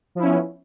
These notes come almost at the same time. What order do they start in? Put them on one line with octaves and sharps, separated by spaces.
F3 E4 C#4 B3